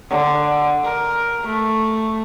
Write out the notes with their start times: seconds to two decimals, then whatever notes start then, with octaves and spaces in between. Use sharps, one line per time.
0.10 D3
0.84 A#4
1.46 A3